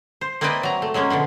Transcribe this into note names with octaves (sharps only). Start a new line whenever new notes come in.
C5
A#3 C4 E4 B4 D5 D#5
F#3 A#5
A3
F#3 G#3 A#3 C#4
B2 D3 F3 B3